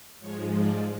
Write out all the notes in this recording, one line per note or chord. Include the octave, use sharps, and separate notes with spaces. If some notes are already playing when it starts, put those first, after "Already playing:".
G#2 F3 G#3 C#5
D5